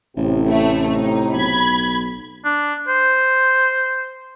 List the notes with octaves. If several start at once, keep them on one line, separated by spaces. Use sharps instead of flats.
A1 A2 C3
A3 E4
D#4
B1 B5 G#6
D4
C5